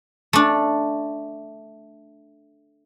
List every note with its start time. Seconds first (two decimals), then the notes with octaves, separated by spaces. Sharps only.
0.33 A3 D4